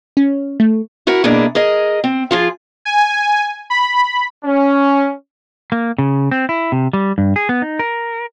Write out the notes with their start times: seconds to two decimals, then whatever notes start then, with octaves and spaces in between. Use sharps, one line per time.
0.17 C#4
0.60 A3
1.07 E4 F#4 A#4
1.24 B2 A#3 D4 E4 G#4
1.55 G#4 A#4 D#5
2.04 C4
2.31 F3 F4 G#4
2.85 G#5
3.70 B5
4.45 C#4
5.72 A#3
5.98 C#3
6.31 C4
6.49 E4
6.72 C3
6.93 G3
7.18 G2
7.36 G#4
7.49 B3
7.62 D#4
7.79 A#4